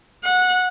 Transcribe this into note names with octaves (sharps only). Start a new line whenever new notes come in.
F#5